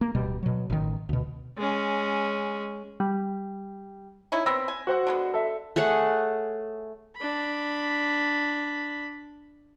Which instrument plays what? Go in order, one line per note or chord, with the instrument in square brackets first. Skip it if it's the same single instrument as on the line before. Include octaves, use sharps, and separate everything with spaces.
[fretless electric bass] A#3
D1 B2 G3
B2 F#3
A1 D#3
D2 B2
[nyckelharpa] G#3 C#4
[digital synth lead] G3
[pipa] C#4 D#4 E4
[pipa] B3 C4 [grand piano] B5 E6 A#6
[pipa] G#5
[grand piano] F#4 C5 F#5
[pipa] D3 G#3 B3
[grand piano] A4 E5
[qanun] A3 G#4 C#5 F#5
[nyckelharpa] D4 B5